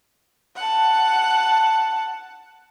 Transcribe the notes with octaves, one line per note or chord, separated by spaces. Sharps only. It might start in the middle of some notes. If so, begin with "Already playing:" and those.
F#5 A5